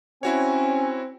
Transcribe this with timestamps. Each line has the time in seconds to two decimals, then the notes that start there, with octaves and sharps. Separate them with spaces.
0.23 C4 C#4 E4 F#4 C#5